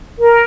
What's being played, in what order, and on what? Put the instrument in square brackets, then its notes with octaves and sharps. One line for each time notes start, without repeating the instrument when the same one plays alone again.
[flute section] A#4